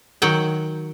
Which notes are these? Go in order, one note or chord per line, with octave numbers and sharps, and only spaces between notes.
D#3 F#3 F#5 G5